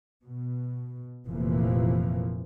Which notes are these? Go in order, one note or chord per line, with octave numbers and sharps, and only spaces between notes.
B2
F1 A#2 E3 F3 A#3